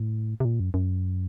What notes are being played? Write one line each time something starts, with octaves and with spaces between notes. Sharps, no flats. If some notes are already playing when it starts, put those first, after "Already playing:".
Already playing: A2
C3
A#2
F#2
F#2